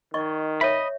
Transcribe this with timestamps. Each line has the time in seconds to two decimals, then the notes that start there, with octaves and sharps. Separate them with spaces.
0.14 D#3 D5 D#5 C#6
0.61 C#5 D#5 E5 B5